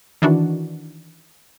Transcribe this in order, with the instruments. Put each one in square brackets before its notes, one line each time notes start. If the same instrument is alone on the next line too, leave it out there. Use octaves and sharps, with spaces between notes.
[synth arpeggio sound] D#3 E3 D4 F#4